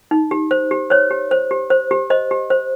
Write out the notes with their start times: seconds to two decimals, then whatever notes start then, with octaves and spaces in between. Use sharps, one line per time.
0.11 D#4
0.31 G4
0.51 C5
0.71 G4
0.90 C5 C#5
1.11 G4
1.31 C5
1.51 G4
1.70 C5
1.91 G4
2.10 C5 D#5
2.31 G4
2.50 C5